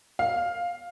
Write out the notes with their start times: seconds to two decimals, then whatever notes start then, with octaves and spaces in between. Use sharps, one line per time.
0.19 F5